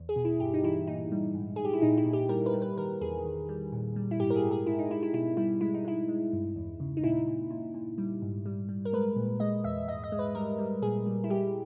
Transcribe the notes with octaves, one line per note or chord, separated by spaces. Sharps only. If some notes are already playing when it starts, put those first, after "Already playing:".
Already playing: E2
G#4
B2
E4
G2 G4
D#4
E3 E4
A#2 D#4
G3
G#2
G#2 G#4
G4
E4
A#2 D#4
E4
A#2
G4
G3 A#4
B4
G3
B4
D#3 A#4
E2 G#4
D#3
G3
A#2
G3
E4
G#2 G4
A#4
G#4
G#2
G#4
G#2 E4
D#4
G#2 E4
E4
B2 E4
G3 E4
G#3 E4
D#4
G#3 E4
G#3
G2
E2
C#3
D#4
A#2 E4
A#2
A#2
A#2
G3
G#2
G3
G3
A#4
G#3 B4
A#2
G#3 D#5
E2 E5
G#2 D#5
D#5
G#3
B4
G3 A#4
G3
A#2 G#4
G3
E4
G3 G4